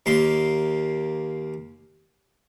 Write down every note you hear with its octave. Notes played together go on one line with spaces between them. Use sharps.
D#2 A#3 C6